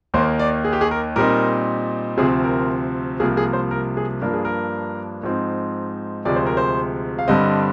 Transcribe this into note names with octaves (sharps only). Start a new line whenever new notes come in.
D#2 D#3 A#3 C5
D5
G#4
G4
G#4
A#4
A#2 G3 C4 D#4 A#4
D2 C3 F3 C4 G#4
A#4
C2 C3 F3 A#3 G#4
G#4
C5
A#4
G#4
G2 F3 A#3 D4 A#4
G#4
A#4
G#2 F3 C4 D#4
D2 C3 F3 G#3 D5
C5
A#4
C5
F5
G2 D3 G3 C4 D#5